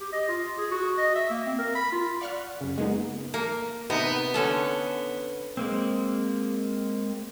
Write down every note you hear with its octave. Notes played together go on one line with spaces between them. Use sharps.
G4
D#5
F4
G#4
F#4
D#5
E5
A#3
C4
A#4
B5
F4
D5 F5 F#5 C#6 F6 F#6
F#2 C#3
G#3 A#3 B3 D#4
A#3
C3 B3 D#4
D3 C#4 A4
G#3 A#3 C4